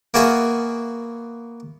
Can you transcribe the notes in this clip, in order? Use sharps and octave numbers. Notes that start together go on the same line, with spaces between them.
A#3 B3 F#4 G#4 E5 F5